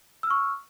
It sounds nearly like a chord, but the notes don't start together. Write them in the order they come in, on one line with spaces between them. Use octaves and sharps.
E6 F6 C#6